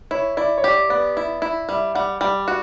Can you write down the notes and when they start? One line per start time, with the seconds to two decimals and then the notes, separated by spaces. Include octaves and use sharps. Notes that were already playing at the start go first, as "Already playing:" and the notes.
0.11 E4 C#5
0.37 E4 D5
0.58 C#5
0.63 G4 D5
0.89 B3 D5
1.17 E4
1.42 E4
1.69 G3 E5
1.95 G3 F#5
2.21 G3 G5
2.48 F#4